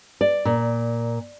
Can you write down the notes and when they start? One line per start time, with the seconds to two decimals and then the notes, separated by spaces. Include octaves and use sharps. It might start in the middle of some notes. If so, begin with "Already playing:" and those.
0.21 D5
0.45 A#2